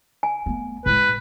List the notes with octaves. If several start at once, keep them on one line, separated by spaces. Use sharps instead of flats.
G#5
A3 B3
A2 G#3 B4